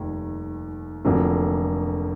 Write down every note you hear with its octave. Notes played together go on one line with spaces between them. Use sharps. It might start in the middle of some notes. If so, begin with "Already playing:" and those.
Already playing: F1 D#2 D#3 G3
F1 F2 D3 F#3 A#3